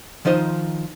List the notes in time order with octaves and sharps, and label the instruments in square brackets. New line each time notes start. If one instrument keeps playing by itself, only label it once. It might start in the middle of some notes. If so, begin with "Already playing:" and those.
[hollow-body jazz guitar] D#3 F3 D#4 C5 D#5